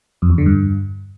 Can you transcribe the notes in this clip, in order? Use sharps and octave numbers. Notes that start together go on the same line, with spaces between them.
F2
E2
D3
G2